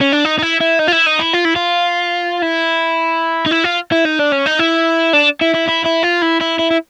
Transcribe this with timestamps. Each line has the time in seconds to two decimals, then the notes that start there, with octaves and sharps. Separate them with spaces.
0.01 C#4
0.12 D4
0.25 D#4
0.39 D#4
0.42 E4
0.60 E4
0.79 D#4
0.87 F4
0.92 E4
1.06 D#4
1.19 E4
1.33 F4
1.45 E4
1.56 F4
2.42 E4
3.46 D#4
3.51 E4
3.64 F4
3.92 E4
4.05 D#4
4.19 D4
4.32 C#4
4.46 D#4
4.59 E4
5.13 D4
5.42 E4
5.55 E4
5.69 E4
5.86 E4
6.04 F4
6.23 E4
6.41 E4
6.59 E4
6.71 E4